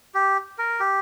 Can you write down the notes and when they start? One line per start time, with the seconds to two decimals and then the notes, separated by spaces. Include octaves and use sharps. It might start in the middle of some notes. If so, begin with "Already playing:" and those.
0.15 G4
0.58 A#4
0.80 G4